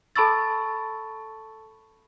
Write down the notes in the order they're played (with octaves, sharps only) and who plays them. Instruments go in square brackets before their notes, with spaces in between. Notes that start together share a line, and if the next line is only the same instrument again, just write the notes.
[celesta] A4 A5 B5 C#6 E6 A6